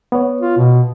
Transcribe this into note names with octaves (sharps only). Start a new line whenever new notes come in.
B3 C#5
F4
B2